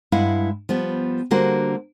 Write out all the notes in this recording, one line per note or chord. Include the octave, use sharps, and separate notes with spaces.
G2 G#3 E4 F5 F#5
F3 G3 B3
D3 G3 A#3 F#4 C5